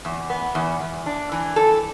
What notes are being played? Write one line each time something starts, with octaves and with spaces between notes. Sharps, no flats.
E2
B3
E2
E2
D4
E3
A4